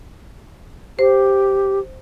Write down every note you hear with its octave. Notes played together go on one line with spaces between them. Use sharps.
G4 C5